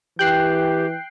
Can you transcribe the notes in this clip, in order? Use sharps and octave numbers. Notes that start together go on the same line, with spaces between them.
E3 G4 G5 F#6 C7